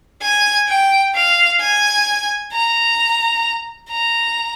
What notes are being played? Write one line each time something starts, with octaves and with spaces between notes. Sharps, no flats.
G#5
G5
F5
G#5
A#5
A#5